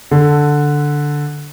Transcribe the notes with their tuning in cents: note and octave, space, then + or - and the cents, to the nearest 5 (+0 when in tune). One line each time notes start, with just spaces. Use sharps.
D3 +0 A4 +0